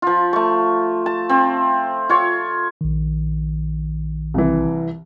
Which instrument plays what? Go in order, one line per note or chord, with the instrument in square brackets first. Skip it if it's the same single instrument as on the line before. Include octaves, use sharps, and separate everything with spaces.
[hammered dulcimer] F3 F4
A3 C#6
A5
C4
F4 C#5
[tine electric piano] A#1 D#3
[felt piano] C2 E3